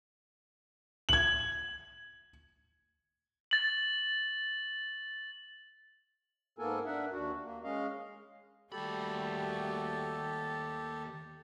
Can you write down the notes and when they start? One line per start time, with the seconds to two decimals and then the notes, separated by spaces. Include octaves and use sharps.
1.09 G#6 F#7
3.51 A6 F#7
6.59 G#2 A#3 B3 A4 A#4 G#5
6.86 D4 A#4 E5 F#5
7.12 D#2 D4 F#4
7.43 A#3
7.64 G#3 C#4 D#5 F5
8.72 D#2 G3 A3 F#4 G4 A4 B5